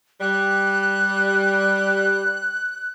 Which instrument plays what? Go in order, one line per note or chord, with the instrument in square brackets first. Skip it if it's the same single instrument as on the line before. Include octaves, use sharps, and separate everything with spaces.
[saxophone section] G3 [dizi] F#6